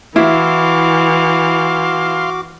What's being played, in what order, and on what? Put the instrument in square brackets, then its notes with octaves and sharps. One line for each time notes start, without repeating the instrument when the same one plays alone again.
[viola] E3 [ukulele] E4 [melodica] F#4 D6 [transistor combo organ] F5 C6